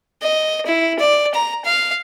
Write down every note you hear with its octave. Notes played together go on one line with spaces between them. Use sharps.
D#5
E4
D5
A#5
F5